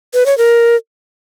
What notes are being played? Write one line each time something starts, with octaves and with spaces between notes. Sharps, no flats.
B4
C#5
A#4